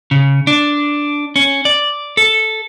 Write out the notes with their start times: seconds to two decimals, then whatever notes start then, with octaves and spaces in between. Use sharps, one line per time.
0.11 C#3
0.47 D4
1.36 C#4
1.65 D5
2.17 A4